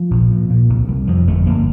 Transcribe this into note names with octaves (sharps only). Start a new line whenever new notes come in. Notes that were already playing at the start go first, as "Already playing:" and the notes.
Already playing: F3
A#1
A#2
A#2
C2
C2
F2 F3
G1 A3
G1 A#3